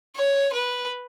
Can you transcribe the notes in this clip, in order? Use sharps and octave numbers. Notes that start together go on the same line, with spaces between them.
C#5
B4